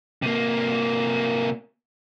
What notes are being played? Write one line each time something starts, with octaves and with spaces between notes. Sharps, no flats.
C3 A#3